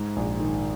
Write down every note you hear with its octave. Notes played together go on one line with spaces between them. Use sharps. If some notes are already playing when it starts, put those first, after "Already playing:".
Already playing: G#2
A#1
D#3